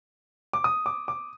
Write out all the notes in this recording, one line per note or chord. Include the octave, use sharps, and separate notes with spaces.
D6
D#6
D6
D6